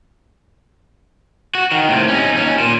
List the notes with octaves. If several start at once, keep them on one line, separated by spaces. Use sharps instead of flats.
F#4
D#3
A2 C3
C#4 D#4
D#2 C#4
A#2